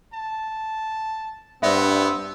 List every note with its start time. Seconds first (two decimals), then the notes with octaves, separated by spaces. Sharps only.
0.14 A5
1.63 G2 B3 C4 C5 D5 E5